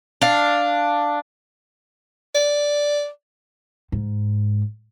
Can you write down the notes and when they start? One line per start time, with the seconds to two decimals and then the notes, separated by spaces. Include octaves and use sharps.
0.21 D4 F5
2.35 D5
3.92 G#2